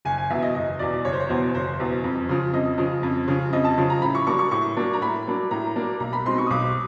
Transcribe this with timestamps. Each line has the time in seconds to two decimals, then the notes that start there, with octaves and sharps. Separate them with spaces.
0.05 F#1 G#5
0.18 G#5
0.30 E2 B2 E5
0.42 D#5
0.55 F#1 D#5
0.79 E2 B2 D5
1.05 F#1 C#5
1.13 C5
1.20 C#5
1.29 E2 B2 C5
1.55 F#1 C5
1.79 E2 B2
2.04 F2
2.29 C#3 F3
2.53 F2 D#5
2.78 C#3 F3
3.03 F2
3.28 C#3 F3
3.53 F2 D#5
3.65 A5
3.78 C#3 F3
3.90 A#5
4.02 A2 B5
4.15 C#6
4.27 F#3 A#3 D4 C#6
4.39 C#6
4.51 A2 C#6
4.77 F#3 A#3 D4
4.93 A#5
5.01 A2 B5
5.27 F#3 A#3 D4
5.51 A2 A#5
5.75 F#3 A#3 D4
6.00 B1 A#5
6.13 B5
6.26 B2 G#3 C4 D#4 C6
6.38 C#6
6.47 D#6
6.50 B1 D6